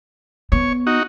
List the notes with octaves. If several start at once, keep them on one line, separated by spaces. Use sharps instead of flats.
B3 C#5
D#4 F#4